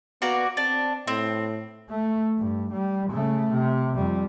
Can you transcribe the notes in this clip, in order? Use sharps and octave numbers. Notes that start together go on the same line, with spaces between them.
A#3 B3 F#4 D5
C4 D4
A2 C4
A3
G2
G3
C#3 A3
C3
F2 G3